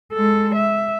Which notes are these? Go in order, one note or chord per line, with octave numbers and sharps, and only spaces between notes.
G#3 A4
E5